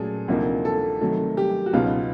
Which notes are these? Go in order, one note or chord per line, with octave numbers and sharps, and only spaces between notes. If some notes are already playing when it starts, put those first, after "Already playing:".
Already playing: A#2 F#3 A3 C#4 G#4 A4
D2 C3 F3 A#3 D#4
A4
C3 D#3 F#3 A3
G4
F#4
C#2 B2 F#3 B3 D#4 F4